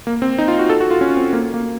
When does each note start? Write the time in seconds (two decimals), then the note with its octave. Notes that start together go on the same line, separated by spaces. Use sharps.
0.07 A#3
0.22 C4
0.38 D#4
0.48 F4
0.59 F#4
0.69 A4
0.81 F#4
0.91 F4
1.01 C#4
1.17 C4
1.33 A#3
1.54 A#3